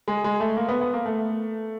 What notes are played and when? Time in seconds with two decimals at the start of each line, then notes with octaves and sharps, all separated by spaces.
0.08 G#3
0.24 G#3
0.40 A3
0.57 A#3
0.69 B3
0.81 B3
0.93 A#3
1.06 A3